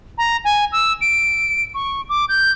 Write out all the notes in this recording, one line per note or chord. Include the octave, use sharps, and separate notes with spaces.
A#5
G#5
E6
D7
C#6
D6
G6